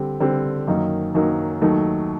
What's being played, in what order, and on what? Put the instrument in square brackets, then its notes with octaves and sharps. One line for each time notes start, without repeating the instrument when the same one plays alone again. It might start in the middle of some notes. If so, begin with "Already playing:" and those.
Already playing: [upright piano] D3 G3 C4 G4
D3 G3 C4 G4
F#2 D#3 F#3 A#3 D#4
F#2 D#3 F#3 A#3 D#4
D#2 D#3 F#3 A3 D#4